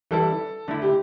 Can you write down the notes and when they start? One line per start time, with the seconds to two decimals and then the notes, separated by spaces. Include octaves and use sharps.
0.11 E3 G3 E4 A4
0.68 D3 A3 E4
0.82 G4